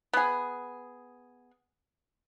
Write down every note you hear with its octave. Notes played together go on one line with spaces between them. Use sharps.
B3 G#4